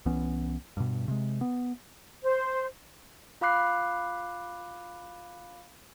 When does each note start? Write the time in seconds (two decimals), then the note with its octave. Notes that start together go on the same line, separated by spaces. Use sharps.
0.05 C2 E3 B3 C#4
0.77 G2 B2
1.08 C3 G#3
1.41 B3
2.23 C5
3.41 F4 F5 B5 D6 F#6 C7